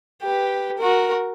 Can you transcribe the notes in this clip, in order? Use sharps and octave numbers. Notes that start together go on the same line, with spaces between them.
G4 B4
F#4 A#4